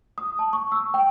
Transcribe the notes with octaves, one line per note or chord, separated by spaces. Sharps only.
D#6
A5
C#6
E6
G5